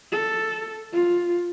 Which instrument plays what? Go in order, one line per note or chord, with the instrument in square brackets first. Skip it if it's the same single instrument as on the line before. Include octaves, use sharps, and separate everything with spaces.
[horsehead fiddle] A4
F4